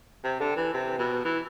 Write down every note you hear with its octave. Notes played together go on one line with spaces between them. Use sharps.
C3
D3
E3
C3
B2
E3